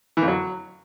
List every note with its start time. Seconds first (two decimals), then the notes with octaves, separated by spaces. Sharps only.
0.17 E3
0.22 F2
0.28 F#3